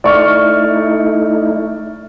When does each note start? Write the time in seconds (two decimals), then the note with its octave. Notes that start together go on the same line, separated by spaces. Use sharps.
0.04 A3 D#4 E4 D5 C#6 F6